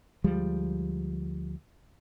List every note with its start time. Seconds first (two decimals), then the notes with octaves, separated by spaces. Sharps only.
0.24 D2 F3 G3 G#3